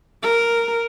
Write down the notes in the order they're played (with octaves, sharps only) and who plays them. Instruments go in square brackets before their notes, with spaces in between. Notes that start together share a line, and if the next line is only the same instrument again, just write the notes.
[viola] A#4